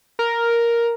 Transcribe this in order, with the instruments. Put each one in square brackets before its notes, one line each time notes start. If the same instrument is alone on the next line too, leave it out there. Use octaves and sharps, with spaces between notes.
[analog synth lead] A#4